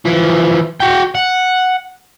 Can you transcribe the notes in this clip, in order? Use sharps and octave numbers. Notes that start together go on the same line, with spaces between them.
E3 F3
F#4 G5
F#5